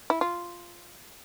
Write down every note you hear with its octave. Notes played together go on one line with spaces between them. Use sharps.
E4
F4